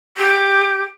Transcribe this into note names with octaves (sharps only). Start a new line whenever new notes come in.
G4